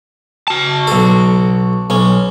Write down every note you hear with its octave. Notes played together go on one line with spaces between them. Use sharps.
F#4 A5
B1 A4
B1 C#4